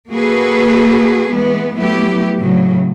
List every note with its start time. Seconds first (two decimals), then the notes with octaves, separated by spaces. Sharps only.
0.11 A#3 F#4 G#4 A4 B4
1.29 E3 G#3 B3
1.76 F#3 A3 B3 E4 G4
2.39 A2 C#3 F#3